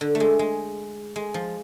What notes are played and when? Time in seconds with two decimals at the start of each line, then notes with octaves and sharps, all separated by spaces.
0.01 D3
0.15 A3
0.20 G#3
0.39 G#3
1.16 G#3
1.34 F3